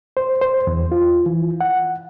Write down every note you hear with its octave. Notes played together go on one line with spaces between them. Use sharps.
C5
C5
E2
F4
E3
F#5